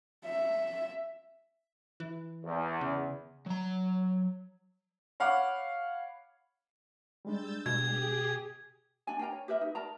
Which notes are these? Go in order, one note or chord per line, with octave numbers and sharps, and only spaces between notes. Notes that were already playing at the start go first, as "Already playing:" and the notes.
E5
E3
E2
C#3
F#3 A#5
C#5 F5 F#5 B5 D6
G3 G#3 D4 E6 G6 A6
B2 G4 G#4 G#6
D4 G#5
D4 A#4 G5 A#5
C#5
G4 A#4 B4 E5
D#4
A#4 D5 A5 A#5